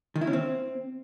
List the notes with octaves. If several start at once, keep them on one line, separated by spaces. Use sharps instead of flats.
D#3
E4
C#4
C4